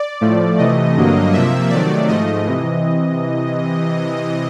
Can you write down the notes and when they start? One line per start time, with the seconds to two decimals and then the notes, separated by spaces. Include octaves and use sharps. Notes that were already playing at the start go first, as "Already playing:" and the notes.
Already playing: D5
0.21 A2 F3 A3
0.58 C3 E3 A3 D#5
0.96 G2 D3 F#3 A#3
1.33 C3 F3 A#3 E5
1.70 C3 D#3 F#3 A3 D5
2.08 G#2 F3 A3 D#5
2.46 C3 E3